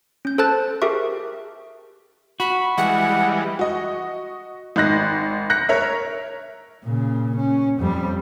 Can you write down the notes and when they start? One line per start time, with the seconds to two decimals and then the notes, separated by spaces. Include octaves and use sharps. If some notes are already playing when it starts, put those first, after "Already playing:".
0.25 C#4 G6
0.38 A4 C5 A5 F#6 A6
0.82 G4 G#4 A#4 E5 C#6
2.40 F#4 B5
2.78 E3 G3 G#3 F#5
3.59 F#4 D#5
4.76 G#1 D#4 F#6 A#6
5.50 F#6 A#6 C#7
5.69 A#4 C#5 E5
6.84 A#2 C#3
7.37 C#4
7.79 F2 G3